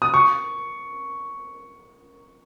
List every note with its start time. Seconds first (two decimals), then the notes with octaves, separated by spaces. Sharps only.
0.02 D#6
0.14 C#6